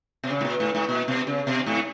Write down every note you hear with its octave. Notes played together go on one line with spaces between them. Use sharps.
B2
C#3
G#2
A#2
G#2
G#2
A#2
B2
C#3
B2
G#2